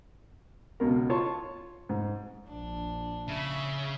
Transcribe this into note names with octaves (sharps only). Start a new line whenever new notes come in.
C#2 B2 A#4
F4 C#5 A5 C6 C#6
G#2
A#1 D4
C#3 E5 B5